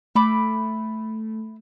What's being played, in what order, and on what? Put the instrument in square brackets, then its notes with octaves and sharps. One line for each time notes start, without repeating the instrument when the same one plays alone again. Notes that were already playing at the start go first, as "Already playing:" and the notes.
[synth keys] A3 [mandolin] E5 B5 D6